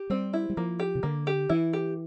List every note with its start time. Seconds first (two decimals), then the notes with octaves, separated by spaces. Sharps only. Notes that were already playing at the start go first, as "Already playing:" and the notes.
Already playing: G4
0.10 G3 C4
0.33 E4
0.50 G3
0.57 F3 A#3
0.80 G4
0.95 C3
1.03 D3 A#3
1.27 G4
1.49 E3 E4
1.73 G4